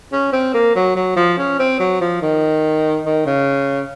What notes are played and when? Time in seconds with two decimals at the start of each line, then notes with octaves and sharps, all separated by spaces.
0.12 C#4
0.33 C4
0.54 A#3
0.75 F#3
0.95 F#3
1.16 F3
1.38 C#4
1.59 C4
1.80 F#3
2.01 F3
2.22 D#3
3.05 D#3
3.26 C#3